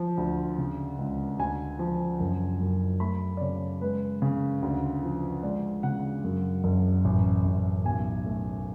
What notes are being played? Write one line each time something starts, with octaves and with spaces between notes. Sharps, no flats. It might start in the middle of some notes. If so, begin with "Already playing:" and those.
Already playing: F3
D2
C#3
C#2
D2 G#5
F3
F#1
F#2
A3 B5
D5
C#3 C#5
G#3 B4
C#3
D2
F3
G#3 D5
C#3 F#5
F#2
F#1
A1
A1
B1 G#5
A3